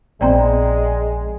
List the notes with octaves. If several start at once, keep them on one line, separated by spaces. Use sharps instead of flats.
A#1 C3 G#3 B3 C4 D5 G5 A#5